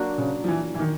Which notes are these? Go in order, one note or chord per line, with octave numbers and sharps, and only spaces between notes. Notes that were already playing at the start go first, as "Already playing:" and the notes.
Already playing: F#3 A#3 D4 F#4
C#3
F3
E3
E3
D#3